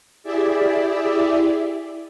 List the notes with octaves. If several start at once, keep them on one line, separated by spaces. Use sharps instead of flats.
E4 G4 G#4 D5 E5